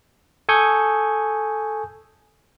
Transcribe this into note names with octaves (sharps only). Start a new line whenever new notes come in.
A4 G#5 C#6 D#6 G6